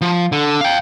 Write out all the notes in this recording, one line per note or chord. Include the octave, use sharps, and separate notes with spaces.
F3
D3
F5 G5